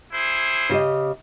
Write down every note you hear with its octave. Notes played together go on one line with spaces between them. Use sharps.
E4 G#4 C5
C#3 G4 D#5